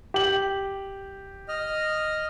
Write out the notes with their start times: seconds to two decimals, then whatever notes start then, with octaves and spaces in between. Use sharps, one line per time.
0.14 G4 F#7
1.48 D#5 F6